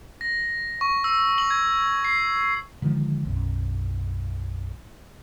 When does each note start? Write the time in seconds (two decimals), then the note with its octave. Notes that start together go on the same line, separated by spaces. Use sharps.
0.21 A#6
0.81 C#6
1.04 E6
1.38 F#7
1.51 G#6
2.04 C7
2.82 D3 D#3 F3 G#3
3.25 B1 F#2